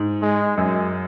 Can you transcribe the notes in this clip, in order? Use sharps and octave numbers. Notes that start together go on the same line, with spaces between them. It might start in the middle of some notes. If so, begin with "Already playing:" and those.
Already playing: G#2
G#3
F#2 G#3